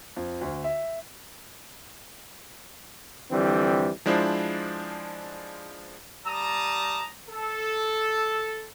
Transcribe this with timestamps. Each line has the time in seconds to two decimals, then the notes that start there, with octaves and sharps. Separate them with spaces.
0.16 F2
0.41 D2
0.64 E5
3.31 F2 D3 E3 G3 C4
4.06 F3 G#3 D4 E4 F4 C5
6.27 G3 A5 A#5 D#6
7.29 A4